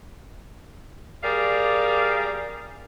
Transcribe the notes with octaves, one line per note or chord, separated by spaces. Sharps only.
G3 G#4 A#4 D5 F5